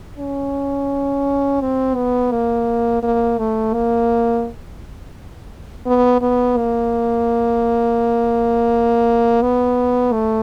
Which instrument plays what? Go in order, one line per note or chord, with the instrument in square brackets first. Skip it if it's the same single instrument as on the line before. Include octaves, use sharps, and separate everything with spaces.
[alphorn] C#4
C4
B3
A#3
A#3
A3
A#3
B3
B3
A#3
B3
A3